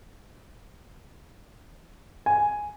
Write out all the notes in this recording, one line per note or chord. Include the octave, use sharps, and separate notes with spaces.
G#5